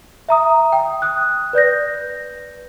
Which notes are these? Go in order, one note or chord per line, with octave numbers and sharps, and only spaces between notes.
E5 A#5 D#6
G5
D#6 F#6
B4 D5 G6 A#6